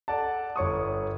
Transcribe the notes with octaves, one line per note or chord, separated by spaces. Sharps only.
A4 D5 F#5 A5
G1 C#5 C#6 D#6